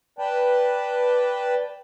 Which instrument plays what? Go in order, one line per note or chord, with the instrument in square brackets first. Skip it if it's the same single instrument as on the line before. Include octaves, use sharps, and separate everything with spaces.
[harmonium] B4 D5 G5 A5